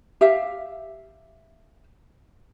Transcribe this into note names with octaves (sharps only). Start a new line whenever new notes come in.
G4 E5 F5